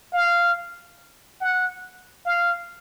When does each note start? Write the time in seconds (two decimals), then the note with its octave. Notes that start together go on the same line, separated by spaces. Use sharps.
0.13 F5
1.41 F#5
2.26 F5